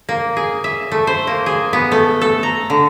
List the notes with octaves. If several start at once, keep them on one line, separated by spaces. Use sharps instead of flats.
A#3
G#4
E5
A3
C5
A#3
G#4
B3
A3
A4
A#5
D3